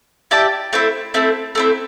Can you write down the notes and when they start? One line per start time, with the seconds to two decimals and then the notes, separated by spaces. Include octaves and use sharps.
0.31 E4 G4 D5 A5
0.73 A3 C4 E4
1.14 A3 C4 E4
1.55 A3 C4 E4